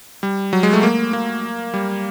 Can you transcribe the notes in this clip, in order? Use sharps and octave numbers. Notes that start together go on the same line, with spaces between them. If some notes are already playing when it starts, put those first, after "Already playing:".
G3
F#3
G#3
A3
A#3
A#3
G3